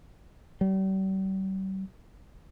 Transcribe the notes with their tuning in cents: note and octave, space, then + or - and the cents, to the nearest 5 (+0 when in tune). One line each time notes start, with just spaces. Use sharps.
G3 -40